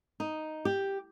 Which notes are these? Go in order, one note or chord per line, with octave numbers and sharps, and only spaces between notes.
D#4
G4